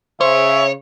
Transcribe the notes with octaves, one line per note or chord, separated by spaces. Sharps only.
C#3 C5 C#5 E5